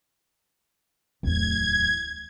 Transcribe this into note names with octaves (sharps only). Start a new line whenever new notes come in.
D1 E2 G#6